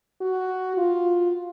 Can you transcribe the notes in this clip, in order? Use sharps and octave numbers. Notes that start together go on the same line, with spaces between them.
F#4
F4